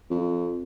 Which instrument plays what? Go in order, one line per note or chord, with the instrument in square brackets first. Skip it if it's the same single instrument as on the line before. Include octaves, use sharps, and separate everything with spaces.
[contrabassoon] F2